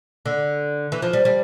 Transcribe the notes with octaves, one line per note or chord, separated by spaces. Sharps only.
D3
E3
F3
G3
G3